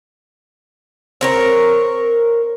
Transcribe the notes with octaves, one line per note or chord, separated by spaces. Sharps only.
C4 A#4 C#5